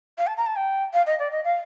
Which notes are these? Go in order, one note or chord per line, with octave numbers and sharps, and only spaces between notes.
F5
A5
A#5
A5
G5
F5
D#5
D5
D#5
F5